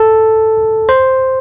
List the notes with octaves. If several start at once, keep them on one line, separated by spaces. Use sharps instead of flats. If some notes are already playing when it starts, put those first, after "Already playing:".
Already playing: A4
C5